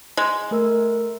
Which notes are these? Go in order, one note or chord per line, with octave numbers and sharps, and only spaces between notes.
G#3
A3 A#4 E6